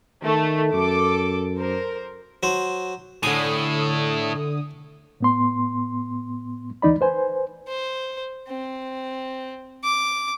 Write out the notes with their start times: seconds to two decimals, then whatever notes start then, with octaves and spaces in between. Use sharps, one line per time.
0.23 D#3 A3
0.74 F#2 A4 D6
1.57 A#4 C5
2.43 F#3 C5
3.23 A2 D3 G#5 D#6
5.20 A2 B3 C6
6.82 D2 E3 D#4 D5 B5
7.01 B4 C5 G#5
7.68 C5
8.48 C4
9.84 D6